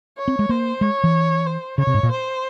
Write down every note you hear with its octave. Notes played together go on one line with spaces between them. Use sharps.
C#5
C4
G#3
A#3 C5
G#3 C#5
E3
C5
C#3 C#5
C3
G#2
A#2
C5